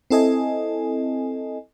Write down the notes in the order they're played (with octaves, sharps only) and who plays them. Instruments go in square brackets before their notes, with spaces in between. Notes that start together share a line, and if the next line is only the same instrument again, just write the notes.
[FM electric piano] C4 E4 A4 D#5 G#5